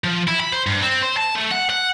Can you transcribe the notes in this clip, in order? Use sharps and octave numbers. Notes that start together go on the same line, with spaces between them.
F3
E4
B5
C5
G2
C4
C5
A5
A3
F#5
F#5